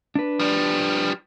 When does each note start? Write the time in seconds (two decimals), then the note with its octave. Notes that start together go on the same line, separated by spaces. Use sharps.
0.15 D4 B4
0.40 F3 G3